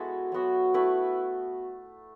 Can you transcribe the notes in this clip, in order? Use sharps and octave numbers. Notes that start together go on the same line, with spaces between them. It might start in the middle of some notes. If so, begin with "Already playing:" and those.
Already playing: G#3 B3 E4 F#4 A4
F#3 B3 F#4
A3 E4 B4